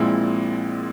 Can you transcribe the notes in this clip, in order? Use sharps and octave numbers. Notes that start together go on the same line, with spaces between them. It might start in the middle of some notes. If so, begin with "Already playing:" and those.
Already playing: A#1 A#2 G#3 C4 E4